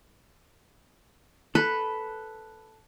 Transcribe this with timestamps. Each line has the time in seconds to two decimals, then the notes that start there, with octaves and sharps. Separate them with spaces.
1.55 A4 B4